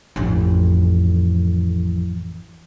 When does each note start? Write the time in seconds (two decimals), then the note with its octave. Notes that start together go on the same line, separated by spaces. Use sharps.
0.16 A1 F2